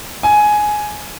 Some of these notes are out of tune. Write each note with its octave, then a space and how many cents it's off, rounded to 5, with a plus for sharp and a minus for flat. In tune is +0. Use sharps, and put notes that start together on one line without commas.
G#5 +10